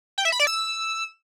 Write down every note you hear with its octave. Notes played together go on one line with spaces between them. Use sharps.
G5
E5
B5
D5
E6